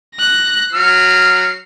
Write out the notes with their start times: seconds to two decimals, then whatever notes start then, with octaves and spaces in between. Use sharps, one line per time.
0.15 F#6 A#6
0.73 F#3 F6 C7